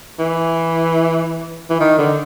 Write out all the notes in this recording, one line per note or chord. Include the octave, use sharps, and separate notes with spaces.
E3
E3
D#3
D3